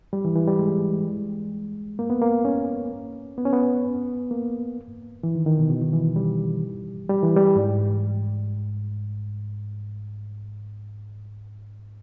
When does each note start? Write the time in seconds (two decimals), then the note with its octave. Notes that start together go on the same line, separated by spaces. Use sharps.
0.13 G3
0.25 E3
0.36 E3
0.48 G3
0.59 G#3
1.99 A#3
2.10 B3
2.21 A#3
2.45 C#4
3.38 B3
3.45 C#4
3.53 B3
4.31 A#3
5.23 E3
5.35 D#3
5.46 D#3
5.59 B2
5.70 B2
5.82 D#3
5.93 E3
6.16 G3
7.10 G3
7.23 E3
7.37 G3
7.56 G#2